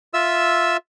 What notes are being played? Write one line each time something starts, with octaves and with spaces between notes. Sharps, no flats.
F4 E5 E6